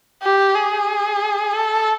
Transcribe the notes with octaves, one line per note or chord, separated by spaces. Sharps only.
G4
G#4
A4